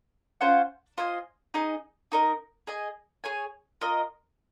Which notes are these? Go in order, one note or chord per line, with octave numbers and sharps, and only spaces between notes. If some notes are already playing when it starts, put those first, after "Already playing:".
C#4 F4 C5 F#5
F4 C5 D#5 G#5
D#4 G#4 D#5
D#4 A#4 D#5
G#4 D#5 G#5
G#4 C#5 G#5
F4 A#4 D#5